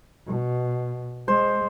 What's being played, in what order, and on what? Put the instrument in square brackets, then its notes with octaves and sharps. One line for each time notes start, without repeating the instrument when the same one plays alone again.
[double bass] B2
[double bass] G#3 [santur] C5